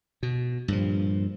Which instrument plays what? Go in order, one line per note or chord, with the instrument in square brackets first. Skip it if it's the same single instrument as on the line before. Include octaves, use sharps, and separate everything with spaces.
[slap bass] B2
G2 A#2 F3